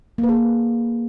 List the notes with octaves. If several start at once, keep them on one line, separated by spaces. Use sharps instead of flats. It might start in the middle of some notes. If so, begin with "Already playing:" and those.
A#3
B4
G#4